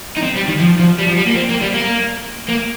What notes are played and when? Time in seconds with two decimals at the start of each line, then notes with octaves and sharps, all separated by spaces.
0.17 D#4
0.23 C4
0.36 G3
0.48 D#3
0.60 F3
0.79 F3
0.98 G3
1.07 F3
1.16 G3
1.26 A#3
1.35 C4
1.49 A#3
1.61 G3
1.74 A#3
2.48 A#3